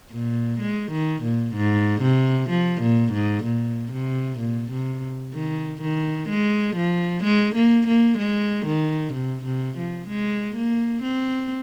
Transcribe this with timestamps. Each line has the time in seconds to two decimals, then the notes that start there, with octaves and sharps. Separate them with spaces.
0.12 A#2
0.60 G#3
0.92 D#3
1.23 A#2
1.55 G#2
2.02 C3
2.50 F3
2.82 A#2
3.13 G#2
3.44 A#2
3.92 C3
4.39 A#2
4.71 C3
5.34 D#3
5.82 D#3
6.29 G#3
6.76 F3
7.24 G#3
7.55 A#3
7.88 A#3
8.18 G#3
8.66 D#3
9.14 C3
9.45 C3
9.77 F3
10.08 G#3
10.56 A#3
11.03 C4